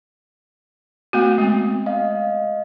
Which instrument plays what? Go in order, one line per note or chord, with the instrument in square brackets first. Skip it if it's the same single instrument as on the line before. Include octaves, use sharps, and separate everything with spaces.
[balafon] A3 B3 F#4
G#3 C4
[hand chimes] D#5 F5